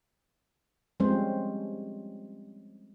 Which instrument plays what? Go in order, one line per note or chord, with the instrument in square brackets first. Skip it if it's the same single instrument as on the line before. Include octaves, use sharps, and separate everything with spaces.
[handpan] F3 G3 G#3 C4 C#4 C5